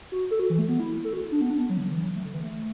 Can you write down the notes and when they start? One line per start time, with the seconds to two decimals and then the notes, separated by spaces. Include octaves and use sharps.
0.12 F#4
0.31 A4
0.39 F#4
0.50 E3
0.59 A3
0.68 B3
0.80 E4
1.04 A4
1.13 F#4
1.32 D4
1.41 B3
1.50 D4
1.60 B3
1.70 F#3
1.78 D3
1.91 E3
2.03 F#3
2.16 A3
2.25 D3
2.34 E3
2.43 A3